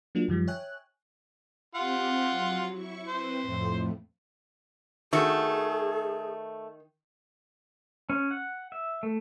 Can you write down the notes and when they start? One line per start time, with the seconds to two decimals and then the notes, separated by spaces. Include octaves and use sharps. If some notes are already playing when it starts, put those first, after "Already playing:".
0.15 F#3 A#3 D4 F4
0.28 F#2 D#3 F3 G3
0.48 C#5 E5 G5 G#5 F#6
1.75 C4 F4 G4 F#5
2.30 F#3
2.72 E4 C#6
3.08 C4 B4 C5
3.42 F2 A2
5.13 D#3 A3 F#4 G#4
8.10 C#4
8.31 F#5
8.72 E5
9.03 A3